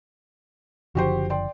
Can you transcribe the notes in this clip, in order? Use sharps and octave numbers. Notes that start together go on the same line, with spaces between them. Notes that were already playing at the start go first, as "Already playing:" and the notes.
F#1 D3 F3 F#4 G4 C5
D5 G5 C6